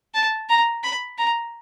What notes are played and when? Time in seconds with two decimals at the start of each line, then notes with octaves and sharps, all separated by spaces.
0.14 A5
0.49 A#5
0.84 B5
1.18 A#5